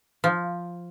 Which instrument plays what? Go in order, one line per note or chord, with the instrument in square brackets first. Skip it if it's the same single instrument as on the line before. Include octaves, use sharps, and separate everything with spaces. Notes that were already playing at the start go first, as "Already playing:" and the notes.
[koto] F3